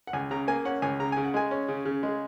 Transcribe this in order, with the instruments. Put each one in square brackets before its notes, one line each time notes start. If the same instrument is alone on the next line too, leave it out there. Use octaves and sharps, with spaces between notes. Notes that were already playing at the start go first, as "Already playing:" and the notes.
[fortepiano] F#5
C#2 G#5
C#3 A#5
A#3 G#5
C#4 F#5
C#2 G#5
C#3 A#5
C#3 G#5
F#5
G#3 G#5
C#4
C#3
C#3
G#3